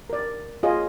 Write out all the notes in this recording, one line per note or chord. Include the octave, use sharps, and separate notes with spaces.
A#4 D5
F4 G#4 C#5 D#5